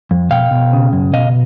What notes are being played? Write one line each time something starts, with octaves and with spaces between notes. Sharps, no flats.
F2
B2 F5 G5
B2
C#3
F#2
B2 D#5 F5